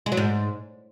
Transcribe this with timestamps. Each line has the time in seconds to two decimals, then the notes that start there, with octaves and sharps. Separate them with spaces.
0.06 G#3
0.12 F#3
0.17 G#2